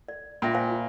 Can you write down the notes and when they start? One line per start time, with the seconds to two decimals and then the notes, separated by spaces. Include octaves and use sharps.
0.09 D5
0.42 A#2 E5 G5 B5
0.55 C5 F5 G#5
0.70 F4